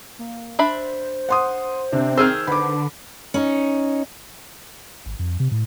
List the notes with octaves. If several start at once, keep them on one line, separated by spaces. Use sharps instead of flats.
A#3
D4 C5 E5 B5
F#5 C6 D#6
C3 C4 D4
D#3 G#4 C5 E6 F6
D3 B4 B5 D6
C#4 D#4
G#1
F2
C3
A2